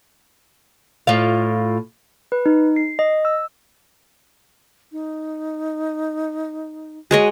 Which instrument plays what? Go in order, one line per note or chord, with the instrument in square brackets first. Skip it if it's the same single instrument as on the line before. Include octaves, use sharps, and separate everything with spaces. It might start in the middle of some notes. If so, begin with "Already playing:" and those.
[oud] A2 F4 F5
[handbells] B4
D#4
C7
D#5
E6
[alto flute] D#4
[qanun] G#3 C#5 D#5 [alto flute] F#4